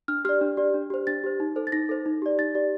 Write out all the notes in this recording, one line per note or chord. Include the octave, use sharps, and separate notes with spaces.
D4 F6
G4 D5 F6
D4
G4 D5
D4
G4 C5
D4 A6
G4 C5
D#4
A4 C5
A6
D#4 A#6
A4 C5
D#4
G4 D5
D#4 A6
G4 D5